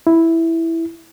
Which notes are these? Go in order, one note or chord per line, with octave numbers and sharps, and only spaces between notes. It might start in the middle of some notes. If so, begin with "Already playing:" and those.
E4